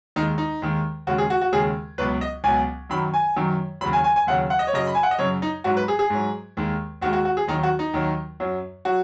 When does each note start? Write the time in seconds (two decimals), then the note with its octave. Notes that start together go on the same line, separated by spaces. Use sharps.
0.16 D#2 D#3 G#3 D#4
0.38 D#4
0.62 D#2 D#3 G#3
1.07 D#2 C#3 G#3 F#4
1.18 G#4
1.30 F#4
1.41 F#4
1.52 D#2 C#3 G#3 G#4
1.98 C#2 B2 F#3 B4
2.21 D#5
2.44 C#2 B2 F#3 G#5
2.90 F#2 D#3 F#3 B5
3.14 G#5
3.36 F#2 D#3 F#3
3.81 D#2 C#3 F#3 B5
3.93 G#5
4.04 G#5
4.16 G#5
4.27 D#2 C#3 F#3 F#5
4.50 F#5
4.59 D#5
4.67 C#5
4.73 F#2 C#3 F#3 D#5
4.87 B5
4.95 G#5
5.03 F#5
5.11 D#5
5.19 F#2 C#3 F#3 C#5
5.42 D#4
5.64 G#2 F#3 F#4
5.77 B4
5.88 G#4
5.99 G#4
6.10 G#2 F#3
6.57 D#2 D#3 G#3
7.01 D#2 D#3 G#3 F#4
7.13 F#4
7.25 F#4
7.37 G#4
7.47 D#2 D#3 F#3 D#4
7.63 F#4
7.79 D#4
7.94 D#2 D#3 F#3
8.40 F#2 F#3
8.85 F#3 F#4